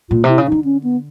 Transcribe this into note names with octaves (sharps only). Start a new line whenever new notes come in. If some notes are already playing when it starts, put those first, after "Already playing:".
A#2 F4
C3 E4
C#3
D3 D#4
C#4
B3